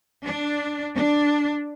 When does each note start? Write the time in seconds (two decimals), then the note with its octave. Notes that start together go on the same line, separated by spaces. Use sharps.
0.24 D4
0.95 D4